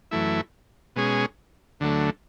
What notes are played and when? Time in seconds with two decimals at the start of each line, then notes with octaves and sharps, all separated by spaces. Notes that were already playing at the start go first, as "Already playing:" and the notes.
0.11 F#2 E3 A3 E4
0.96 B2 G#3 C#4 G#4
1.80 D2 D3 F#3 A3